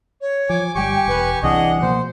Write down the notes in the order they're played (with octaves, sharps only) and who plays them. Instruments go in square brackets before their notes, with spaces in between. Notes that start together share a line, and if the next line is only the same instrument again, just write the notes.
[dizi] C#5
[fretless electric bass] F3 [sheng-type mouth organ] G#5 D6
[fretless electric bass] G1 G3 [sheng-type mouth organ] G4 G#5 C#6 [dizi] G5
[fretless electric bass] E1 [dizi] B4
[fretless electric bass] C2 C3 E3 [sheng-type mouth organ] D4 G#4 D#5 [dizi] F#5
[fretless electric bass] B2 F3 A#3 [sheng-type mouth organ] C5